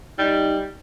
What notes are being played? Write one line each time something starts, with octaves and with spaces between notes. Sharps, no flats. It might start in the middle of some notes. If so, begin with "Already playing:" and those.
G3 D#4